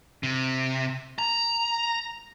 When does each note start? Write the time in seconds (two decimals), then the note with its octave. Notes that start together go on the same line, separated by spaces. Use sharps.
0.23 C3
1.19 A#5